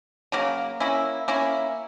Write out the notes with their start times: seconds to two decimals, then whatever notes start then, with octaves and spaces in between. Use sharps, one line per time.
0.32 C#3 F#3 A#3
0.80 A#3 C#4 E4
1.28 A#3 C#4 E4